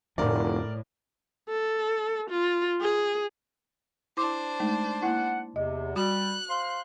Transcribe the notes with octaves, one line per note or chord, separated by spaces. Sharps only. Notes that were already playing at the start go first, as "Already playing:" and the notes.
F1 F2 A2 D3 F3 A#4 D5
A4
F4
G#4
D4 E4 C5 C6 D6
G#3 A3 D#4
A#3 E4 F#5
E2 C3 D#5
G3 F#4 F#6
C5 F5 C6